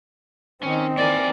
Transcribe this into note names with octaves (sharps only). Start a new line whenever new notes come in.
D#3 C4 C#4 D#4
D#3 E3 A#3 A#4 D5 G#5